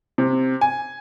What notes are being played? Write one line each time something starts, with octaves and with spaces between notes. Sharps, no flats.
C3
G#5